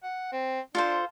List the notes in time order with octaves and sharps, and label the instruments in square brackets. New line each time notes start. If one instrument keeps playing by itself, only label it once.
[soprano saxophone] F#5
C4
[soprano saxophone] D4 [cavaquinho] F4 A4 C5